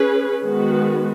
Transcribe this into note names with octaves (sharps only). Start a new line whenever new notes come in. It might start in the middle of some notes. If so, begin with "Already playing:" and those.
Already playing: C#4 G#4 B4
D#3 G#3 B3 F#4 B4